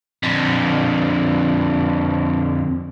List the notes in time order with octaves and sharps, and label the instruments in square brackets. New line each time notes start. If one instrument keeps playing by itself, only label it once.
[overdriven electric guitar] F2 D3